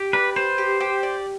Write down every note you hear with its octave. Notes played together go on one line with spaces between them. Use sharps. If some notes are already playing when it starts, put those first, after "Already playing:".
Already playing: G4
B4 D5
B4 C5
G4
G4
D5